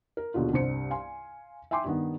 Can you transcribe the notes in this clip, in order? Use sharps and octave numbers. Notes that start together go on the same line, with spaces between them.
A#4
D#2 B2 D3 F4
C2 G2 C5 C#7
F5 G#5 C6
E5 G5 G#5 C6 D6
G2 D#3 B3